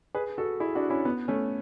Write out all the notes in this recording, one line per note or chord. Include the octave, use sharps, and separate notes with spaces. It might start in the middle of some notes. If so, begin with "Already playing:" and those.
G#4 B4
F#4 A4
E4 G#4
D4 F#4
C#4 E4
B3
A3 C#4